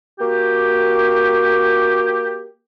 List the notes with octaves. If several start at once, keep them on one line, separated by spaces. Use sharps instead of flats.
A#3 F#4 G4